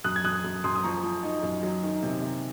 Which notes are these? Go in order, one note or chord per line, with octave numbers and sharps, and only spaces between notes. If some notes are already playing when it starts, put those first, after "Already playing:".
F#2 D#6 F#6
G#6
F#2 D#6 F#6
F#2
F#2 C6 D#6
D#6
F3 A#5 C#6
F3
D#4
F#2
F#3
D#3
C3
C3